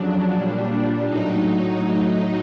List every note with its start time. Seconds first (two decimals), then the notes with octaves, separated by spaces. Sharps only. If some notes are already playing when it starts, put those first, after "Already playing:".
Already playing: F2 C#3 F#3 D4
0.32 A#2 G3
1.07 A2 F#3 D#4